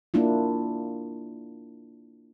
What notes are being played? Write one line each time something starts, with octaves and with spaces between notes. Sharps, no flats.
A#3 D4 E4 F4